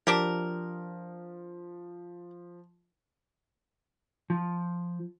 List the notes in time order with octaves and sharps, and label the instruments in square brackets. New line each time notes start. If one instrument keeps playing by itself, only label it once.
[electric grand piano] F3 [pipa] D4 G4 A#4
[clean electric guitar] F3